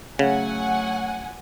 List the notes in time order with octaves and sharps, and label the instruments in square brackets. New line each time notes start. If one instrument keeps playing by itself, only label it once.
[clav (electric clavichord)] C#3 [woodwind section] F#3 A3 [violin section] F#5 G#5